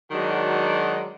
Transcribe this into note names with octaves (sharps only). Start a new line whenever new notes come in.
D#3 F#3 G#3 D4 F#4